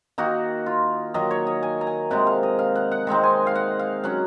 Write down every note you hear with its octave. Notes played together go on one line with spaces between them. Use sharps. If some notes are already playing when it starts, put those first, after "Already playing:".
D#3 A#3 D#4 F#4
F4
D#3 F#3 A#3 D#5
C#5
D#5
G#5
A#5
G#5
C3 D#3 G#3 F#5
F5
D#5
F5
F#5
F#5
D#3 G#3 C4 D#4
G#5
F5
F#5
F5
F#3 C#4 F#5